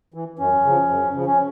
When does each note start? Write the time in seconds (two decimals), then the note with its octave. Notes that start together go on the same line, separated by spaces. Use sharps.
0.14 E3
0.39 F#2 C#4
0.65 C#3 F3
0.89 F#2
1.14 C#3 F3
1.26 C#4